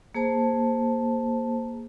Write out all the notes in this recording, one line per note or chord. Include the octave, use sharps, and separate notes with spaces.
A#3 G#4 C5 A5